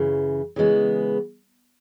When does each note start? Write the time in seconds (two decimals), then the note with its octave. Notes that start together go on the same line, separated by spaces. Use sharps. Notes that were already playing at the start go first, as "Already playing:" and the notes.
Already playing: F#2 C#3 E3
0.56 C#3 E3 G#3 B3